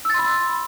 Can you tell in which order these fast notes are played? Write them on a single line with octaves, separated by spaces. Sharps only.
E6 A6 C6 B5